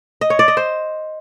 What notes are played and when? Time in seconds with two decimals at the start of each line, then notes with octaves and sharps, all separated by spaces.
0.21 D#5
0.30 C#5
0.39 D5
0.48 D#5
0.57 C5